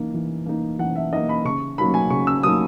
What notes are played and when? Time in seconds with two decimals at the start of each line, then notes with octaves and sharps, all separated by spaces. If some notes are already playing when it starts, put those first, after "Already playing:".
Already playing: E3 A#3 D#4
0.14 E3
0.46 A#3 D#4
0.79 E3 F#5
0.96 E5
1.12 A#3 D#4 D#5
1.29 B5
1.45 C#3 C#6
1.78 F#3 A#3 D#4 B5
1.94 G#5
2.10 C#3 C#6
2.27 E6
2.43 F#3 A#3 D#4 D#6